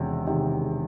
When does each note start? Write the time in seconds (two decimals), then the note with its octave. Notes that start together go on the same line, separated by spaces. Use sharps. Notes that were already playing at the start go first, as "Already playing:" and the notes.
Already playing: E1 E2 C3 D#3
0.27 C3 D#3